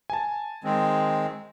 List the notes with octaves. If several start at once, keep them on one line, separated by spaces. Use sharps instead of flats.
G#5 A5
D#3 G#3 C4